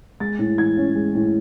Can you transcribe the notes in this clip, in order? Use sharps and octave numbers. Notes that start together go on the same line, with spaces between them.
G#3 A6
A2
E3 G#6
C#4
G#3
A2